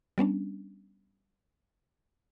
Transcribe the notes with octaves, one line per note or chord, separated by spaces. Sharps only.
G3 B3 C#4 D4